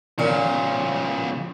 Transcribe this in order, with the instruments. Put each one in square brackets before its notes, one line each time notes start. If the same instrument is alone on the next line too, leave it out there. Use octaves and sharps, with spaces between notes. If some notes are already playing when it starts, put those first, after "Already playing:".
[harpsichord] A#2 [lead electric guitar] C#3 F3